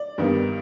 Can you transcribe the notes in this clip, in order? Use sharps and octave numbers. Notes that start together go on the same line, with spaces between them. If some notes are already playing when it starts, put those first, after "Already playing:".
Already playing: D5
G2 D#3 B3